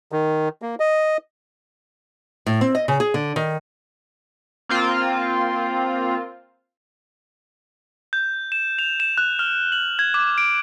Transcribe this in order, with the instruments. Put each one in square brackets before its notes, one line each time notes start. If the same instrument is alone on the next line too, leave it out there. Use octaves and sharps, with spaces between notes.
[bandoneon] D#3
A#3
D#5
[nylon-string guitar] A2
C4
D#5
C#3
G#4
D3
D#3
[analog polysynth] A#3 C4 F4
[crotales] G6
E7
F7
E7
F#6
F6
F#7
G#6
D6
D7